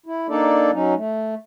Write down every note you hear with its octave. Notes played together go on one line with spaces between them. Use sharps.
E4
A#3 D4 D#4 A4 D5
F#3 C#4 D#4
A3